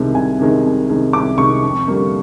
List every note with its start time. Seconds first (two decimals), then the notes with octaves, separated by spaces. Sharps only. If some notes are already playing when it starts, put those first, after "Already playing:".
Already playing: C2 C3 D#3 G#3
0.15 C2 G#5
0.39 C3 D#3 G#3
0.64 C2
0.90 C3 D#3 G#3
1.13 C2 D6
1.38 C3 D#3 G#3 C#6
1.63 F2
1.88 D3 G3 A#3